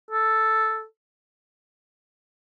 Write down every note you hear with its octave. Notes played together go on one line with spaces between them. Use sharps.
A4